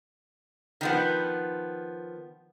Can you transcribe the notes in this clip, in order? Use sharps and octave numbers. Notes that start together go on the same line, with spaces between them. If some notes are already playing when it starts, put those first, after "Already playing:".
D#3 F3 B3